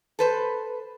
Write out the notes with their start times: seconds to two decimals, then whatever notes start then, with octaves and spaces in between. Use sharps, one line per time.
0.19 A4 B4 C5